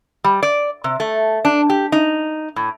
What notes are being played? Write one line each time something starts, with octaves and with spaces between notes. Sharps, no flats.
G3
D5
C3
A3
D4
G4
D#4
A2